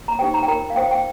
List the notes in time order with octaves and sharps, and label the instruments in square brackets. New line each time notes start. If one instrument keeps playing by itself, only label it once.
[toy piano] A#5
D#4 G4 C5 G5
A#5
G5
F4 A#4 A#5
F5
F4 C5 G5
G5